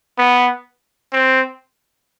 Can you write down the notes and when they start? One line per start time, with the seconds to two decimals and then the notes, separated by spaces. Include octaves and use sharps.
0.19 B3
1.13 C4